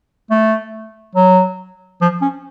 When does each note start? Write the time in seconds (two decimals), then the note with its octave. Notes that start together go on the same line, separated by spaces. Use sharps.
0.30 A3
1.16 F#3
2.01 F3
2.22 C#4